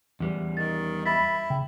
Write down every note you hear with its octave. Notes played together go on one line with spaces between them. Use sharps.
E2 G3
D#3 A6
E4 B5 A6 B6
C#3 G5